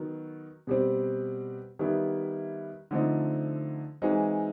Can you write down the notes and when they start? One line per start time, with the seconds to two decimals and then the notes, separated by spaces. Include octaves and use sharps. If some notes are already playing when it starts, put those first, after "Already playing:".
Already playing: D#3 F#3 B3
0.67 B2 G3 C4
1.79 D#3 G3 B3 E4
2.91 D3 F3 A3 C4 D#4
4.02 E3 G#3 C4 D#4 F#4